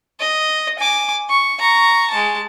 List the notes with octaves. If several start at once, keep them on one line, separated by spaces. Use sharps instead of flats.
D#5
G#5 D6
C#6
A#5 C#6
G#3 A5